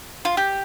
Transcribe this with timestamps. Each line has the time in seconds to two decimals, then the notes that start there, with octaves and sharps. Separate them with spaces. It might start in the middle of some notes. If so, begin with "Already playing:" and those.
0.25 F4
0.37 G4